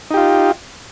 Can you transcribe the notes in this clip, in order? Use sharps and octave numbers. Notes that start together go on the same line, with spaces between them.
D#4 F4 G4